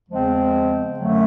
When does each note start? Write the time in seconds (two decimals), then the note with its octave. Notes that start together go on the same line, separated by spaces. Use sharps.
0.09 E2 C#3 F3 G#3 C4
0.99 F#2 D3 F#3 A3